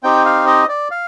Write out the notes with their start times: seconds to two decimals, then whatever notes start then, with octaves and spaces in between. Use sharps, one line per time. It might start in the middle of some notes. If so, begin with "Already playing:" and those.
0.03 C4 D#4 G4 G5
0.25 F5
0.47 D#5
0.69 D5
0.91 F5